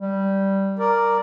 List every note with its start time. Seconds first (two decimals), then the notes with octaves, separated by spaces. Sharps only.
0.01 G3
0.79 A#4 D5